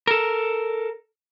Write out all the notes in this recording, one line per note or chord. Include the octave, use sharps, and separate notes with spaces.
A4 A#4